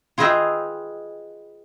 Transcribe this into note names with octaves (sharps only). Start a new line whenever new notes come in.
F4 G#4 B4 D#5 E5 G5